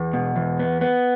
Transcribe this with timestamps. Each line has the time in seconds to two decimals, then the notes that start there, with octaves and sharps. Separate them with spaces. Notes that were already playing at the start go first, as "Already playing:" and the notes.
Already playing: E2
0.13 B2
0.36 E2
0.59 B3
0.81 B3